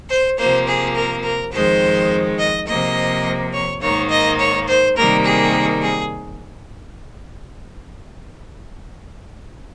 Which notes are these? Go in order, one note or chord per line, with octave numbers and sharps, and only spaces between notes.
C5
C3 F3 A#3 C5
G#4
A#4
A#4
F2 D#3 G#3 C5
D#5
C3 F3 A#3 D#5
C#5
G#2 D#3 A#3 C#5
D#5
C#5
C5
C3 D#3 G3 A#3 A#4
G#4
G#4